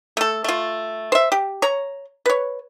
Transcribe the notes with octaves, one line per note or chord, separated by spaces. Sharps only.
A3 A4
A3 F4
C5 E5
G4
C#5 A#5
B4 C#5